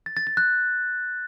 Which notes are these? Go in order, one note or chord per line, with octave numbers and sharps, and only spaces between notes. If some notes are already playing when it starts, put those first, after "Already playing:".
A6
A6
A6
F#6